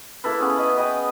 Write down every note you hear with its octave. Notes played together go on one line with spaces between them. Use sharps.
A#3 E4 A4 B4
B3 C#4 G#4
D#5
B4 D#5 G5 B5